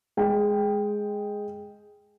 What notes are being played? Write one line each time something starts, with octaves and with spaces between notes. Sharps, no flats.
G#3 G5